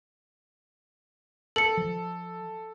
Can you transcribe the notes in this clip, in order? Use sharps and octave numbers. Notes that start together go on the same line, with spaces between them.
A4 C#7 F#7
F3